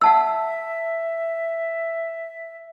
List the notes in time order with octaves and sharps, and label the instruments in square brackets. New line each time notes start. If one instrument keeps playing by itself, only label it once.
[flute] E5 [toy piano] F#5 A5 E6